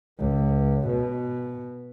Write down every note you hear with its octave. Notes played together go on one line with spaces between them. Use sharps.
C#2
B2